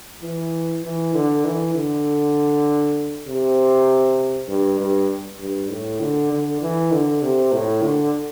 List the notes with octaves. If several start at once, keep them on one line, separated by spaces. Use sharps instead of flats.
E3
E3
D3
E3
D3
C3
G2
G2
G2
A2
D3
D3
E3
D3
C3
A2
D3